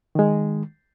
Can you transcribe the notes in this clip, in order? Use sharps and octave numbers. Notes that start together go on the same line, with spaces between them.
D#3 G#3